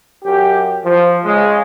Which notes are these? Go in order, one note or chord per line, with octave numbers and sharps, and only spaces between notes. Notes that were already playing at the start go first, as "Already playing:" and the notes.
F#2 G4
F3
C#3 G#3